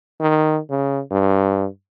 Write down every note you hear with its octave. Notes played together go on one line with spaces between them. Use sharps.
D#3
C#3
G2